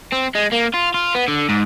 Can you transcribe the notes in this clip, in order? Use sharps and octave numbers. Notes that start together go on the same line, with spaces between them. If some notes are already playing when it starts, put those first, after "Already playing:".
C4
G#3
A#3
F4
F4
B3
D3
G#2